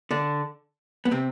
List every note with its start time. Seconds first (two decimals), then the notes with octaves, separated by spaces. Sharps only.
0.11 D3 D4
1.05 B3
1.11 C3 C4